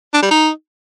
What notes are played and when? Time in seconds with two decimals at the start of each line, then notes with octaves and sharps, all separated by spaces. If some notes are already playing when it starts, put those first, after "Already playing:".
0.14 D4
0.22 G3
0.31 D#4